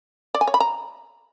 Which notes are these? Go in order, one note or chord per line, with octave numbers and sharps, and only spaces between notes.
D5
G#5
C#5
B5
A#5